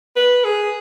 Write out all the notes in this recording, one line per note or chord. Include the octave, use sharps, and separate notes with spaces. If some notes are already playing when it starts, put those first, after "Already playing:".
B4
G#4